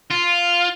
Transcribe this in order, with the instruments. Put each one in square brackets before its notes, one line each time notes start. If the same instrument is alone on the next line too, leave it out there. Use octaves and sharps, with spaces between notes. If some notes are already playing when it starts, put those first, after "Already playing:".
[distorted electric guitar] F4